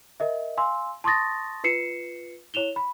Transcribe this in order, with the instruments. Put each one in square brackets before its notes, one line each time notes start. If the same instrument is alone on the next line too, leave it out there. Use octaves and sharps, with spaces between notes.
[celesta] A#4 D#5 E5
F5 G#5 C6 E6
A5 C6 C#6 D#6 A6 A#6
F4 B4 C7 C#7 E7
E4 C#5 E7 F7 G7
B5